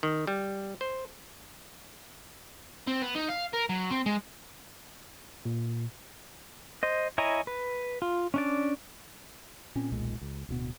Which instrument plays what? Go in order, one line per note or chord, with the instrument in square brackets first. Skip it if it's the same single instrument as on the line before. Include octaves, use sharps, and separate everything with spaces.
[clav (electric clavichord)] D#3
G3
C5
[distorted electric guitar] C4
B3
D#4
F5
A#4
F#3
C4
G#3
[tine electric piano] A#2
[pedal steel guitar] C5 D#5
E4 C#5 D#5 G#5 A#5
B4
F4
C#4 D4 D5
[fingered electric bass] A#2 C4 C#4
D#1 B1 A#2 G#3
C#2
D1 B2 B3